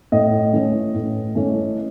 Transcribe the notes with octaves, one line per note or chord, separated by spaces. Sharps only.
A2 D#5
E3 A3 C#4
A2
E3 A3 C#4